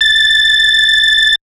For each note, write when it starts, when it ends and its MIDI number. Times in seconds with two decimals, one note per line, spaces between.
0.01 1.35 93